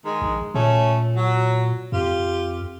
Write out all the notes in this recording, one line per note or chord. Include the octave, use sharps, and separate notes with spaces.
D#3 G#3
A#1
A#2 A3 C#4
F#3
F2 F4 G4